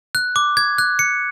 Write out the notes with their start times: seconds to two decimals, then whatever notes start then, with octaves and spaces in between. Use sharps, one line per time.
0.15 F#6
0.36 D6
0.57 G#6
0.78 F#6
0.99 C#7